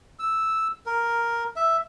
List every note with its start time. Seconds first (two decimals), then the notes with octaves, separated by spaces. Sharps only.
0.19 E6
0.86 A#4
1.56 E5